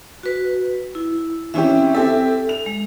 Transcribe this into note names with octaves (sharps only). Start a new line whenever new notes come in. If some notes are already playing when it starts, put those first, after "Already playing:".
F#4 B4
E4
E3 C4 C#4 E4 G4 E5
C4 G4 A4 E5
F7
G#3